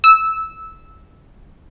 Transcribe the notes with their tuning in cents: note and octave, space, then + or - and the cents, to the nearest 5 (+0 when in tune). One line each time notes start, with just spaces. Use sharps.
E6 -15